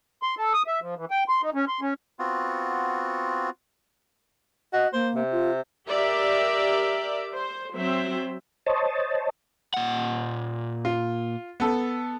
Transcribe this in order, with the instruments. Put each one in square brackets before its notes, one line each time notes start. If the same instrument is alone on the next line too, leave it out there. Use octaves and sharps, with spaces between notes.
[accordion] C6
A4
D#6
E5
F3
E3
G5
C6
D#4
C#4
C6
C#4
[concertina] B3 C4 F4 F#4
[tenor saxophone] F#4 [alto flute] D#5
[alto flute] A#3 [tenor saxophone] C5
[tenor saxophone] C3
[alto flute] F4
[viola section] G4 A#4 D5 E5
C5
F#3 C4 C5 E5
[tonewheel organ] C5 C#5 D#5 A5
[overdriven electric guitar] A#2 F#5
[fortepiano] F4
B3 A4